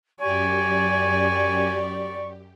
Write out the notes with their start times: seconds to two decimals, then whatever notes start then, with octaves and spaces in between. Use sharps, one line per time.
0.21 F#2 G4 D5 G#5 C#6